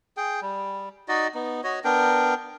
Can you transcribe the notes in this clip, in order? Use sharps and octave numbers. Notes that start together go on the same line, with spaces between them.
G#4 G5
G3
D#4 F#4 D5 D#5
B3 D#4
F#4 C#5 D#5
B3 D4 A#4 G5